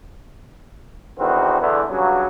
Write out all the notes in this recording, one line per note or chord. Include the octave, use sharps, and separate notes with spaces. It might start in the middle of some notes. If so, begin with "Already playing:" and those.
E2 D3 D#3 C4 F#4 B4
E2 D3 E3
G2 C#3 F#3